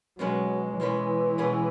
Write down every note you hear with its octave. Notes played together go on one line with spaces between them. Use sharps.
B2 F#3 G#3 C#4 G#4 B4
B2 E3 G#3 C#4 G#4 B4
B2 G#3 C#4 G#4 B4